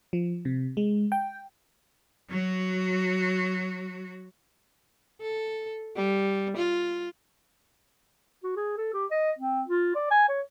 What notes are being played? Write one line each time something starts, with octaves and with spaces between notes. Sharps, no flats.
F3
C3
G#3
G5
F#3 F#4
A4
G3
F4
F#4
G#4
A4
G4
D#5
C4
F4
D5
G#5
C#5